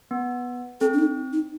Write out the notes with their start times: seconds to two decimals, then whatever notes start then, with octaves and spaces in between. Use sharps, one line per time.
0.11 B3
0.81 C4 A4
0.94 D4
0.99 D#4
1.33 D#4